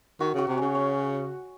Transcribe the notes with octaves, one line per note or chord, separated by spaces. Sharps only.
D#3 F#4
C#3 F#4
C3
C#3 C#4
C#4